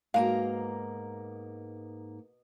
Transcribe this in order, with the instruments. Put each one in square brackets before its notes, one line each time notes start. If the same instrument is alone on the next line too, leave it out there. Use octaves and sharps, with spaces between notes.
[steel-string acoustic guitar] G#2 A#3 A#5 [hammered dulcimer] B2 [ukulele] F5